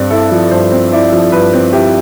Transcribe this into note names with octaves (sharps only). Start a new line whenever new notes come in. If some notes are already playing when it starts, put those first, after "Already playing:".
Already playing: G2 C4 D5
E4 A4
F3
G2 C5
C4
E4 D5
F3
G2 B4
C4
E4 G4